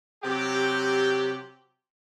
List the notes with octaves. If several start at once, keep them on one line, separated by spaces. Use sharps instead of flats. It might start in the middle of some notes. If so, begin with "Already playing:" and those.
C3 F#3 G4